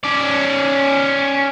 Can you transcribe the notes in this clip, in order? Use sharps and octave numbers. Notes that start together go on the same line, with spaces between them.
C#4 D5